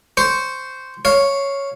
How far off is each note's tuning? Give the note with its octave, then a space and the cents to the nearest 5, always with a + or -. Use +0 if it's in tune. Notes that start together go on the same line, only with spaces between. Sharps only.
C5 -10 C#6 +0
C#5 +0 F5 +0